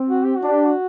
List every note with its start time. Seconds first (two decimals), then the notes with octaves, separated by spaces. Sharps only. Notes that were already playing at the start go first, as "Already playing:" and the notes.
Already playing: C4
0.09 F#4
0.24 G4
0.37 F#4
0.43 D4
0.51 G4
0.65 F#4